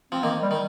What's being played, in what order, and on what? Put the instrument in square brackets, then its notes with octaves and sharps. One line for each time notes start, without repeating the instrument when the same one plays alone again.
[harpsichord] F3 [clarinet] C4
[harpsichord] D#3 [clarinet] A#3
[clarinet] G3
[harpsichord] D#3